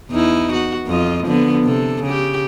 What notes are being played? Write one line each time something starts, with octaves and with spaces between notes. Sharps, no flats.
E2 D#4 E4
F#4
F2 F4 D#5
D3 F3 B3
C3 A4
C#3 G4